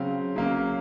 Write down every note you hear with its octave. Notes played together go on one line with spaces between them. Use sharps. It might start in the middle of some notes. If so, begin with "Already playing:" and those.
Already playing: C#3 F#3 C4 F5
C#3 F#3 A#3